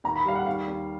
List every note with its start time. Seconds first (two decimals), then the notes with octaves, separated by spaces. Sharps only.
0.04 D#2 A#5
0.16 B5
0.25 G3 F5
0.35 F#5
0.46 D#2 F5
0.68 D#2